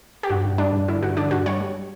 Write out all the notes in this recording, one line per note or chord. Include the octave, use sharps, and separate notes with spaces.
G4
G2 F#4
G2
G3 D4
G2
D3 E4
G2 F#4
D3 D4
G2 F#4
G3 C#5
G3